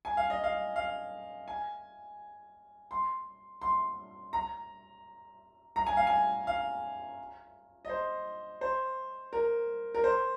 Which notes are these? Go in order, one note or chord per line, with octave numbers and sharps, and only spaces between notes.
G#5
F5
D#5
F5
F5
G#5
C6
C6
A#5
A#5
G#5
F5
G#5
F5
D#5
C5
C5
A#4
A#4
C5